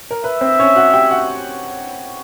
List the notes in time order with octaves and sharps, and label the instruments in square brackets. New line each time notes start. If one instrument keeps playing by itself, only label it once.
[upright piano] A#4
[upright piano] B4 [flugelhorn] E5
[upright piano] C4 C5
C#4 C#5
F#4 F#5
G4 G5
F#4 F#5